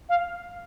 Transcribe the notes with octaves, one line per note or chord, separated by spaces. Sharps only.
F5